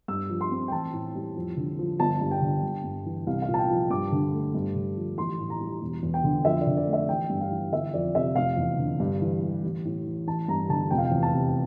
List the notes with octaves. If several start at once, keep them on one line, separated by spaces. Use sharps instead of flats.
G2 E6
F3
C6
C4
G5
A1 A5
A2
G3
F2
D3
F3
G1 A5
G2
G5
D3
G1
G2
E3
C2 F5
F5
A#2
A5
G5
F3
G2 D6
D3
A3
G2
D3
F3
A1 C6
A2
A#5
G3
E1
E2
G5
D3
F2 E5
D5
D3
D5
A3
E5
A1 G5
G2
F5
E3
G1 E5
F2 D5
C3 E5
F1 F5
E2
D3
G2
E3
G3
A1
A2
E3
A1 A5
G2 A#5
D3 A5
F1 G5
F5
G5
E2
A5
C3